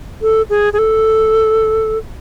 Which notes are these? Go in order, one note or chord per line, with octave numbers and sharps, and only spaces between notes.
A4
G#4
G#4
A4